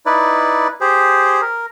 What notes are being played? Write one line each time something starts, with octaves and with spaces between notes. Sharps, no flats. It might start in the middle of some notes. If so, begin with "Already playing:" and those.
D#4 E4 B4 D5
G4 G#4 C5
A#4